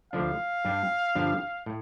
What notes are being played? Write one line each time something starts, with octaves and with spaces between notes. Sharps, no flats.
D2 D3 F3 D4 F5
G2 G3 D4
G2 D3 F3 D4
A2